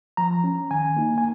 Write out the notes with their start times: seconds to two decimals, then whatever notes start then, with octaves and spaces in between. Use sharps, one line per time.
0.17 F3 A#5
0.44 C#4
0.71 D#3 G#5
0.97 A#3 D#4
1.18 G#5